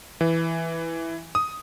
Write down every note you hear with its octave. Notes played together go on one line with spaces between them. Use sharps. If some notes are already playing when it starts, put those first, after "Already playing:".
E3
D#6